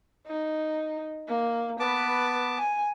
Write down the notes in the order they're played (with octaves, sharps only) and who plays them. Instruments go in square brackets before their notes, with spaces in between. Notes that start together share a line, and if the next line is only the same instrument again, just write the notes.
[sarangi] D#4
A#3
[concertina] B3 A5 D6 [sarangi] B4
[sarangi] G#5